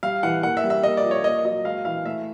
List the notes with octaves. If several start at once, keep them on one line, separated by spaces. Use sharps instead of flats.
G3 F5
E3 F#5
A#3 F#5
E5
G3
E5
A#3 D#5
D5
F3
C#5
A#3 D#5
F#3 D#5
G#3 F5
E3 F5
A3 E5